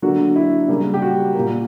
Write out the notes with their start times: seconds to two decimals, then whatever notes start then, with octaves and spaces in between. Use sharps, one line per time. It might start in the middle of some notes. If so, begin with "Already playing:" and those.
0.02 D3 F#3 A#3 F#4
0.36 E4
0.68 C#3 G3 A#3
0.94 G4
1.02 F#4
1.35 A#2 A#3